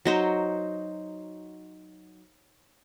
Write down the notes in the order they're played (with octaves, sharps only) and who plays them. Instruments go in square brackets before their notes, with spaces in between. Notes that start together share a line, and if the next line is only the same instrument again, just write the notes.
[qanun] F#3 D#4 C5